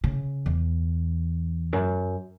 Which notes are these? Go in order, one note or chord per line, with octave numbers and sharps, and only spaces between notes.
C#3
E2
F#2